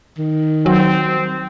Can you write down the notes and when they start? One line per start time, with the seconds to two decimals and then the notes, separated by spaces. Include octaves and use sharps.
0.18 D#3
0.66 F#3 C4